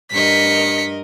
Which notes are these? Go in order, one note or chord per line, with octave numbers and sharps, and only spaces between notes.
G2 A#4 D#5 B6 C#7